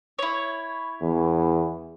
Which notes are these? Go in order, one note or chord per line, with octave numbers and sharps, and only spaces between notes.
E4 C#5
E2